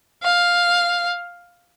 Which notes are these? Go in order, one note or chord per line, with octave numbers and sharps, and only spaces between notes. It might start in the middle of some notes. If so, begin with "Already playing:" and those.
F5